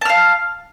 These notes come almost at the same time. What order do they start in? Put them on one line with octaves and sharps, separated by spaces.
A5 F6 F5